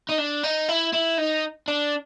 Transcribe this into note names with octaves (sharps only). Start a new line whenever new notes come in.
D#4
D4
D#4
E4
E4
D#4
D4